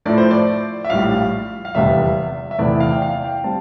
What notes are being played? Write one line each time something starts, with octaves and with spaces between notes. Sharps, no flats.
A2 F3 A3 E4 D5
C5
D5
E5
A#1 A2 G3 F5
F5
F1 E2 C3 G3 E5
E5
E2 C3 E3 A3 E4 D5
F5
G5
F5
G5
G3 C4 A5